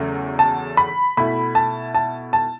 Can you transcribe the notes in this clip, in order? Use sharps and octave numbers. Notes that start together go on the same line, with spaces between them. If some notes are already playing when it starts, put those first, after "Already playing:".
Already playing: E2 C#3 F#3 A3
A5
B5
B2 A3 E4 B5
A5
A5
A5